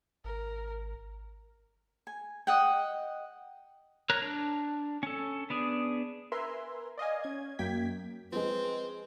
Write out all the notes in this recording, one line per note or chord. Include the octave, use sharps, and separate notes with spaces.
G#1 A#4
G#5
D#5 F#5 G5
A#4 C#5 A#5 F#6
D4
C#4 A4
B3 D4 G#4
A#4 B4 E5 G#5 A#5 C6
D5 D#5 F5 G#5
C#4 G#6
F#2 A#3 G5 G#6 B6
F3 G#3 C4 B4